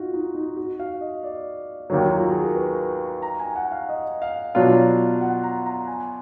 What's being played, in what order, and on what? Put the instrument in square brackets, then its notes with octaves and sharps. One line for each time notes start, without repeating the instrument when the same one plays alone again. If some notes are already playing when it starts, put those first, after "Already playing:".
Already playing: [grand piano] D#4 F4 F#4
D#4
D#4
F#4
F5
D#5
D5
[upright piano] D#2 D#3 F#3
[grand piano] F4
F#4
G#4
A#4
B4
A#5
G#5
F#5
F5
D#5
F5
[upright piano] B2 F#3 D4 F4
[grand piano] F#5
A#5
A#5
G#5